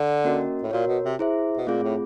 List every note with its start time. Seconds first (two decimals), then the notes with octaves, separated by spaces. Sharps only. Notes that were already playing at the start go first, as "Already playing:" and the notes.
Already playing: D3
0.24 A#3 C#4 F#4 A#4 D#5
0.63 A2
0.71 A#2 F#4 A#4 C#5
0.87 B2
1.04 C3
1.19 E4 G#4 C5 E5
1.57 B2
1.67 A#2 A3 C4 F4 G#4
1.83 A2